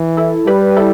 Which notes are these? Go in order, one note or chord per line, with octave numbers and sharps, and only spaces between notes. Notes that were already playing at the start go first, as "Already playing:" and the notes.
Already playing: E3
E4 A4
G3 G4 B4
E4 A4